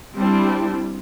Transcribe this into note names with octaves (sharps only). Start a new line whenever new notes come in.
G3 C4 D4 E4